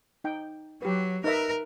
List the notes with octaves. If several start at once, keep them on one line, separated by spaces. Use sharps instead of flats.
D#4 G5
F#3 G4 B4
D#4 A#4 B4 E5